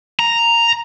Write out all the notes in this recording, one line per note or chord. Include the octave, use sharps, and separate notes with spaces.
A#5